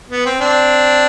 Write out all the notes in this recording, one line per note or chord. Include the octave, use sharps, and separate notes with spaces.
B3
C4
C4 D4